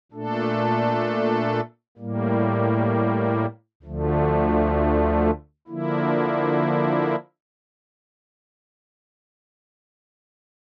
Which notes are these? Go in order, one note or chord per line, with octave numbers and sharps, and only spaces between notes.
A#2 A3 D4 A4
A2 G3 A#3
D2 D3 F3 A3
D3 F3 A#3 E4